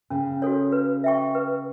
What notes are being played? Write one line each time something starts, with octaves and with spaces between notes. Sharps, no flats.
C#3 C#4
F#4 A4 C#5
B4
E5 G5 C#6
B4